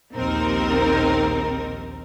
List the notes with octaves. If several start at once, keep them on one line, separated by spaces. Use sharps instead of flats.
A#1 D#2 C4 D#4 A#4